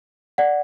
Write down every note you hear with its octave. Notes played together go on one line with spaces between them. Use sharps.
D5 F#5